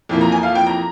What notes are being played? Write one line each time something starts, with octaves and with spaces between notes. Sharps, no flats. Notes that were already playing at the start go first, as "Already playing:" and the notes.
F2 E3 A#3
A#5
G#5
F5
G5
A#5